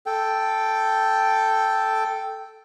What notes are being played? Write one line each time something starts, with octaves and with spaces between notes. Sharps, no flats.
A4 G5